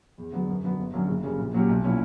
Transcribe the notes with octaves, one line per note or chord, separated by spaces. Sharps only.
E2
D3 F#3 B3
F#2
D3 F#3 B3
G1
F#2 D3 F#3 C#4
F#1
F#2 C#3 G3 C#4
A#1
A#2 F#3 C#4 G4
B1
A#2 F#3 C#4 E4